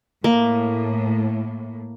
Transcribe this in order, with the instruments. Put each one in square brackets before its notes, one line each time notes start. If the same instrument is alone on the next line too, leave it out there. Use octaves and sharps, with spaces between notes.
[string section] A2 [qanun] A#3